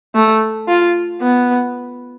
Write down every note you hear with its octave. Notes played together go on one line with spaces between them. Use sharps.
A3
F4
B3